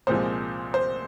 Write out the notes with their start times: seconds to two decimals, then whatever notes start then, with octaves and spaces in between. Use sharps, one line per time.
0.07 C2 A#2 F3 G#3 C5
0.74 C5